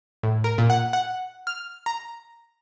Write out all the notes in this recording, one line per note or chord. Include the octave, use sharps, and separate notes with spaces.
A2
A#4
A#2
F#5
F#5
F6
A#5